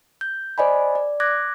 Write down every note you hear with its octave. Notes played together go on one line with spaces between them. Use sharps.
G6
C5 D5 D#5 G#5 B5
D5
D6 F#6 G#6 A#6